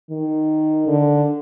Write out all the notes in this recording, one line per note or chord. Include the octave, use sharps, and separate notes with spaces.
D#3
D3